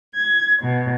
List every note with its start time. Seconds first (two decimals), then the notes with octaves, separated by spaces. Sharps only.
0.17 G#6
0.63 B2